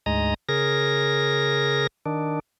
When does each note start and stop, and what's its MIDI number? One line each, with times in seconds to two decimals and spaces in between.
0.06 0.34 38
0.06 0.34 44
0.06 0.34 56
0.06 0.34 75
0.06 0.34 82
0.49 1.87 49
0.49 1.87 68
0.49 1.87 70
0.49 1.87 94
2.06 2.39 51
2.06 2.39 62